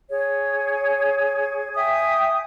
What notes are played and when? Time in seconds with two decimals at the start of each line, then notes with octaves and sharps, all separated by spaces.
0.09 G#4 C#5
1.75 E5 G5 G#5 D#6